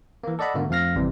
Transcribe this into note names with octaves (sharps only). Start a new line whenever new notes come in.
E3 A#3
A4 D5 D#5 F#5 B5
G#2 B2 D3 A3 A#3 F#4
F2 F3 A3 F5 F6 A#6
G#1 C3 E3 G3